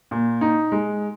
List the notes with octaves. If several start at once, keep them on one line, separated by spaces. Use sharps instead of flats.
A#2
D#4
G#3